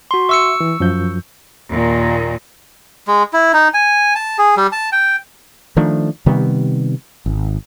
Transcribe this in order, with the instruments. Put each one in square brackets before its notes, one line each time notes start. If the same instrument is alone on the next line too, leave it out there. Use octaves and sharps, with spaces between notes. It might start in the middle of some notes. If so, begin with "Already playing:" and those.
[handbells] F#4 C6
[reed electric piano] E5 [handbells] C#6 E6 C#7
[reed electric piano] E3
F#2 F3 G6
[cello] D#2 A#2
[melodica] G#3
E4
D#4
G#5
A5
G#4
G3
A5
G5
[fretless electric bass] D#3 F3 A3 D4
C3 D#3 G3 B3
G#1